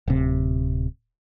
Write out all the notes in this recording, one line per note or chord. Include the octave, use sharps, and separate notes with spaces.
D1 C3